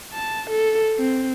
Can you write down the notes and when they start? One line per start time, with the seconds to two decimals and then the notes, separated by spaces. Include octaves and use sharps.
0.14 A5
0.50 A4
0.98 C4